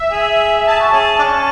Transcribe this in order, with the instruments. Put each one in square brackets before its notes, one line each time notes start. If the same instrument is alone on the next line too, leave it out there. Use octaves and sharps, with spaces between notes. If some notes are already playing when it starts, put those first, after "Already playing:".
Already playing: [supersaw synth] E5
[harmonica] G#4
[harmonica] G#4 [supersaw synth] A5
[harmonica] F#4
C#4 G#4
D4
C#4